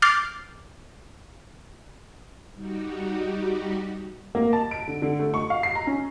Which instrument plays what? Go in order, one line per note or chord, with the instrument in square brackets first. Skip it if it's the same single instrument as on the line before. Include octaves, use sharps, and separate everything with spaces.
[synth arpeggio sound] D6 F6 G6 A6 C7
[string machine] G3 D#4 F#4 G4
[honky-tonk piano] A#3
A5
D7
D3
D3
A3
C#6
F5
C7
A#5
C#4